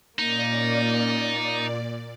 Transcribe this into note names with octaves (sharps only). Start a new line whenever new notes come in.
A#2 A#3 C#4 D#4 D5